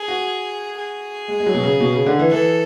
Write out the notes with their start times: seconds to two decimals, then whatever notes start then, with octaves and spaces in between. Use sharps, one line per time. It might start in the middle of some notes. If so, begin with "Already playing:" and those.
Already playing: G#4
0.08 F#4
0.77 G#4
1.28 G#3
1.40 G#3
1.46 F#3
1.54 B2
1.64 C#3
1.80 B2
1.93 C#3
2.06 D3
2.19 E3
2.32 E3 A4